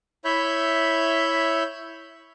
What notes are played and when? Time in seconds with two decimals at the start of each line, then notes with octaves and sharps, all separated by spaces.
0.25 E4 C#5 E5 B5 G6